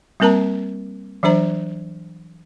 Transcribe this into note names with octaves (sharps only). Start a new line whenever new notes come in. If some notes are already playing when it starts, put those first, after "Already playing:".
G3 A#3 C4 A#4 A5 A#5
E3 F#3 D4 C5 A#5